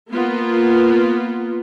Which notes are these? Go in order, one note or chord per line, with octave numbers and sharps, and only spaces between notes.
A#3 B3 F4